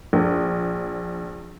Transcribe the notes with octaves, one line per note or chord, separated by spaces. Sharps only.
A#1